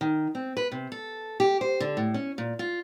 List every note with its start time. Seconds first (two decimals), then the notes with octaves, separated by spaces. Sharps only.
0.01 D#3
0.35 C4
0.57 B4
0.72 C3
0.92 A4
1.40 G4
1.61 C5
1.80 D3
1.97 A2
2.14 C#4
2.38 A#2
2.59 F4